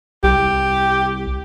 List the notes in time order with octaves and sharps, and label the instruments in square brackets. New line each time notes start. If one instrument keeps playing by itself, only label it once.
[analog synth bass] C2 [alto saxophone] G4